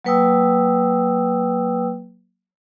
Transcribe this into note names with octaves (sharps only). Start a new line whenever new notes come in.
F#3 A#3 B4 G5 D#6 E6